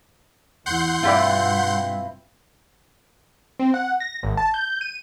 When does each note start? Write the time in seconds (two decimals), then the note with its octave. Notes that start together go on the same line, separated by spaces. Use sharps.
0.66 E2 E4 F#5 C6 G6
1.03 G2 B2 C4 E4 F4 G4 B4 D5
3.60 C4
3.74 F#5
4.00 A#6
4.23 G#1
4.37 A5
4.54 G6
4.81 D#7